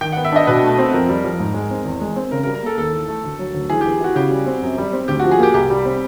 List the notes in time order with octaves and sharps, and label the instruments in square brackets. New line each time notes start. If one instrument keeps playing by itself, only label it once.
[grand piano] D#3 [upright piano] G5
[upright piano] F#5
[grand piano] B3
[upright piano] E5
[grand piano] D4 [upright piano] D#5
[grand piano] B2 [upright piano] B4
[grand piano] A3
C4
[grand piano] F2 [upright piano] A#4
[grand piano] G3
F2
G#2
G#3
C4
E2
G#3
C4
[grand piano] C#3 [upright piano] A#4
[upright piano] A#4
[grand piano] G3
[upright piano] A#4
[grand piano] A#3 [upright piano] A4
[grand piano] D#2 [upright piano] A4
[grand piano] E3
A3
D2
F#3
D2
[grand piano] E3 [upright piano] G#4
[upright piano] G4
[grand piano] B3
[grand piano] E4 [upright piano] F#4
[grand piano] C#3 [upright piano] G4
[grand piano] G3
C4
F#2
G3
C4
[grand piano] D2 [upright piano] G4
[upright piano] F#4
[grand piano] F3
[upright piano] G#4
[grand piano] A#3 [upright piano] G4
[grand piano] C2 [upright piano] G4
[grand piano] G3
C4